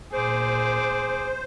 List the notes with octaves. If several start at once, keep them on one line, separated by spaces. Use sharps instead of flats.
A#2 G#4 C5 D6